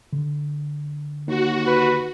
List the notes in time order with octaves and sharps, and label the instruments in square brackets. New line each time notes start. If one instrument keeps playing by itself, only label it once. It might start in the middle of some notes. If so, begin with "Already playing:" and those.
[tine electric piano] D3
[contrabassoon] D#2 [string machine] F#4
[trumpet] B4